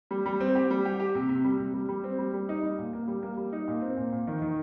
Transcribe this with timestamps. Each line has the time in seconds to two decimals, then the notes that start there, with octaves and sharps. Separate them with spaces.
0.11 G3
0.26 G3
0.40 C4
0.55 G4
0.70 G3
0.85 G4
1.00 G4
1.15 C3
1.29 C3
1.44 G3
1.59 C3
1.74 G3
1.89 G3
2.04 C4
2.19 G3
2.34 G3
2.49 D#4
2.63 G3
2.79 A#2
2.93 A#3
3.08 G3
3.23 A#3
3.37 G3
3.53 D#4
3.68 A#2
3.82 C4
3.97 A#2
4.12 A#2
4.27 D#3
4.42 D#3